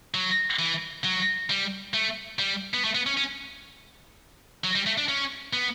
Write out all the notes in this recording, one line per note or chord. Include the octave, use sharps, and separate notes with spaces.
F#3
E3
F#3
G3
A3
G3
B3
A3
B3
C#4
C#4
F#3
G3
A3
D4
C#4
B3